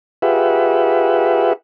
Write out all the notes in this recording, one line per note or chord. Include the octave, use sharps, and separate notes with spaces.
F4 G4 G#4 B4 E5 F#5